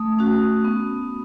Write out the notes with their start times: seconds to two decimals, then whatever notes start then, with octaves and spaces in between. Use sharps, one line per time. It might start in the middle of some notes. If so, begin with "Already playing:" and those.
Already playing: A3 D#6
0.19 C#4 F#4
0.65 B3